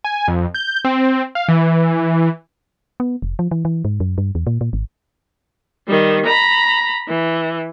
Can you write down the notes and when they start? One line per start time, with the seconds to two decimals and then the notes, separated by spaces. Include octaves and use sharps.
0.04 G#5
0.28 F2
0.54 G6
0.85 C4
1.35 F5
1.48 E3
3.00 B3
3.22 F1
3.39 F3
3.51 E3
3.65 E3
3.85 G#2
4.00 F#2
4.18 G2
4.35 E2
4.47 A#2
4.61 A#2
4.73 G#1
5.88 D#3 G3
6.25 A#5 B5
7.08 E3